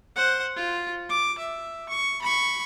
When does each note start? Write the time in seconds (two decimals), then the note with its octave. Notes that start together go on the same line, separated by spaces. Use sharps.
0.16 C5 F#5
0.56 F4
1.09 D6
1.39 E5
1.89 C#6
2.22 B5 C#6